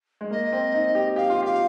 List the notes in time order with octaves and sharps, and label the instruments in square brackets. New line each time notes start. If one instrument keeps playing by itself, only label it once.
[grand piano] G#3
[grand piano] A#3 [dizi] D#5
[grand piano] C4
D#4
G4
[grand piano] G4 [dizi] F5
[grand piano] F4
[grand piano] G4 [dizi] F5